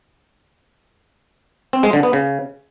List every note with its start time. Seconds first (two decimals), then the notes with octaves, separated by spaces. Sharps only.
1.73 C4
1.83 G#3
1.93 D3
2.03 B3
2.13 C#3